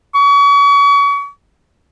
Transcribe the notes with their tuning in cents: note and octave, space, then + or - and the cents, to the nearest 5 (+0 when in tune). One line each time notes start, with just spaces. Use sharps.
C#6 +35